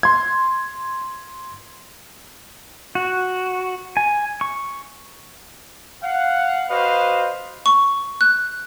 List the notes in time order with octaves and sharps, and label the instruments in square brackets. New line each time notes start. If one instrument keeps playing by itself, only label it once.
[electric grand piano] C6 G#6
[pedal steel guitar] F#4
G#5
C#6
[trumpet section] F5 F#5
F#4 B4 C5 D#5 F5
[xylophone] C#6
F#6